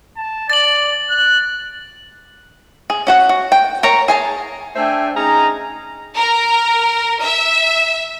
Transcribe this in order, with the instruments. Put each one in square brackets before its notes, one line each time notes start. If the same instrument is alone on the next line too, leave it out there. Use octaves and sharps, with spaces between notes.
[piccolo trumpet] A5
[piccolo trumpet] D5 [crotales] A6 F#7
[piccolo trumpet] F#6
[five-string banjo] G#4
C#4 F#4 F#5
F#4
G5
A#4 C#5 A#5
G#4 G#5 A5
[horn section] A3 D4 C5 E5 G5 G#5
C#4 D#4 G#4 A#5
[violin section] A#4
E5